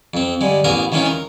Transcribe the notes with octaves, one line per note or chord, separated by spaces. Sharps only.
F2 C4
G2 D3 G#3
A1 A#3 B3 G#4 A#4 A#5
D#3 E3 G#3 C#4 D#4 F4
A#4